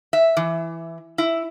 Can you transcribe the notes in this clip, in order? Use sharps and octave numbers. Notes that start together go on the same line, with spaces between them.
E5
E3
E4